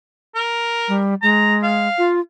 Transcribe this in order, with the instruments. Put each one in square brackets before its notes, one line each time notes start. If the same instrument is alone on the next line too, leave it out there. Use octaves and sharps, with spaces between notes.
[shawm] A#4
[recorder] G3
[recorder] G#3 [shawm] A#5
[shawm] F5
[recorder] F4